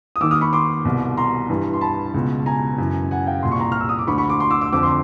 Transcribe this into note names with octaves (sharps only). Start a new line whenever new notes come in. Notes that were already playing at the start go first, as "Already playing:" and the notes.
D#6
D#2 D#3 D6 E6
D#6 F6
B5 C#6
C6 D6
C2 B2
A#5 C6
G2 E3
C6
A5 B5
C#2 B2
G#5 A#5
F#2 C#3 E3
F#5 G#5
F5 G5
C2 A#2 C6
C#6
A#5 C6
F6
E6
D#6
D6
D2 D3 B5 C#6
B5 C#6
C6 D6
C6 D6
D6 E6
D6 E6
F2 D3 D6 E6
C6 D6